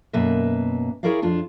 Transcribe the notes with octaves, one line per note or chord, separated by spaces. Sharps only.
F#2 B2 A#3 B4 E5
E4 G#4 A#4 C#5 D5 F5
F2 D4 F4